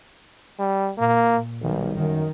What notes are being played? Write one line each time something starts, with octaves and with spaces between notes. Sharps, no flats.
G3
A#2 A#3
B1 D#3 G3
F#2 D#3